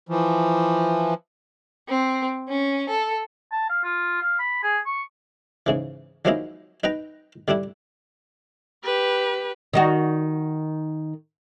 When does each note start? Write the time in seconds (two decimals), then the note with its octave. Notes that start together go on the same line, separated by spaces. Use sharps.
0.09 E3 F3
1.89 C4
2.49 C#4
2.89 A4
3.52 A5
3.69 F5
3.84 F4
4.22 F5
4.39 B5
4.63 G#4
4.86 C#6
5.66 G#2 C#3 E3
6.25 F3 F#3 G#3 A#3 D#4 E4
6.84 D#4 B4 G5 A#5
7.48 D3 G3 D4 E4
8.84 G4 B4
9.73 D#3 D#4 F#4